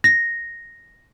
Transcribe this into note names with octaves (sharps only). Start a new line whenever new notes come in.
A#6